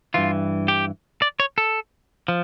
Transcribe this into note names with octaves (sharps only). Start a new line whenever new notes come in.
G2 E3 F4
G4
D5
C#5
A4
F3